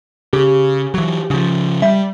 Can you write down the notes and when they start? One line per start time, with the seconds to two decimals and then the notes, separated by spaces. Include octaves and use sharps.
0.33 C#3 G4
0.94 E3 F#3
1.30 C#3 F3
1.82 G3 E5